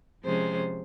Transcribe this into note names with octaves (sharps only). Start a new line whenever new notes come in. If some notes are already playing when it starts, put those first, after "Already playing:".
C3 F3 G#3 C#4 C5